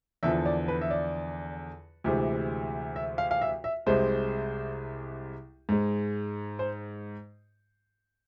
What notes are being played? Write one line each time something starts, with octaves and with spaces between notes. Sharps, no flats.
E2 D3 F3 E5
D5
B4
E5
D5
D2 C3 E3 G#3
E5
F5
F5
E5
E5
C2 C3 G#3 C5
G#2 G#3
C5